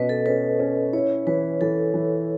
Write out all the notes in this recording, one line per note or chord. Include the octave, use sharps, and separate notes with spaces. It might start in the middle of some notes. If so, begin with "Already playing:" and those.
Already playing: B2 C#4 B4 D#5
A4
C#4 B4
C#4
E4 C#5
E3 B4
E3 A4
E3